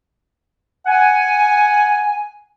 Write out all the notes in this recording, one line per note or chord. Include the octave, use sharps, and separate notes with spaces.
F#5 G#5